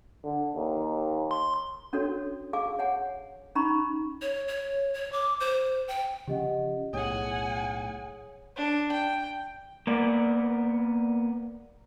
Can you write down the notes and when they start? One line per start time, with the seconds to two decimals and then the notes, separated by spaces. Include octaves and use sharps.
0.24 D3
0.55 D#2
1.31 C6
1.93 C#4 D4 F#4 A4 C#5
2.53 G#4 F5 G#5 D6
2.79 C#5 F#5 G#5
3.55 C#4 D#4 A#5 B5 C#6
4.22 C#5
4.48 C#5
4.94 C#5
5.13 D6
5.40 C5
5.88 G5
6.27 C#3 F3 C#4 G4 D#5 F#5
6.93 B1 A2 G#4 C#5 F#5 G#5 D#6
8.57 D4
8.92 G5
9.87 A#3 B3 D5